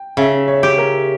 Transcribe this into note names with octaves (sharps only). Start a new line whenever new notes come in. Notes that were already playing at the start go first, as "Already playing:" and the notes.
Already playing: G5
C#3 E5
C#5
G4
A#4